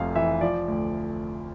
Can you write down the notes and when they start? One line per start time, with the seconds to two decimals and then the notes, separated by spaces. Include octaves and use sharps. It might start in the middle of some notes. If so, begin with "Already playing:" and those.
Already playing: F1 F2 C3 F5
0.16 E3 E5
0.41 F3 D5
0.68 D2